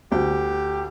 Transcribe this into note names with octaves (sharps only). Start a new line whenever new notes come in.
D2 G4